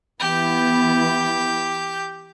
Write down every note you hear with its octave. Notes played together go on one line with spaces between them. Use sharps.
E3 B3 E4 G4 G6